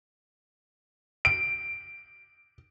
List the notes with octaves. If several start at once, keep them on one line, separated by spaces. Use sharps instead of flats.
D7